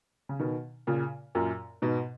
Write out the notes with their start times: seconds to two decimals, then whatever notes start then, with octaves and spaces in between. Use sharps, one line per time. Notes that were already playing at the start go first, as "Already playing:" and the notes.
0.29 C#3
0.39 B2 D#3
0.87 A#2 C#3
1.35 F#2 A#2
1.82 G#2 B2